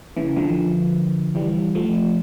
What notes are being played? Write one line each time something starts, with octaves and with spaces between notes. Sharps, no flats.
C#3 E3
D3 F3
E3 G3
F3 A3